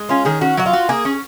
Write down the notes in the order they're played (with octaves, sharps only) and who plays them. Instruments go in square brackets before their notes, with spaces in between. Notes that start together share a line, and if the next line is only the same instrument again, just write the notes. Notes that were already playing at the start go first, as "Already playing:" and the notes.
Already playing: [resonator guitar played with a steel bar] G#3
[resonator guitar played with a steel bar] C#4 [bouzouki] F4
[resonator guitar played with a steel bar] D#3 [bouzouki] G#4
[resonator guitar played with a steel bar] C#4 [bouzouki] F#4
[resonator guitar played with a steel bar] F#3 [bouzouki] F#4
[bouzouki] F4
[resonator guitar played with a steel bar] F#4
[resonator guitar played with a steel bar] A#3 [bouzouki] G#4
[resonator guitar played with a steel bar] C#4